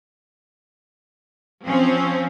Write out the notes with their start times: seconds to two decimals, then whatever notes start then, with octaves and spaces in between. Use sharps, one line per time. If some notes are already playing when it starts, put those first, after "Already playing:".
1.66 F3 C4 C#4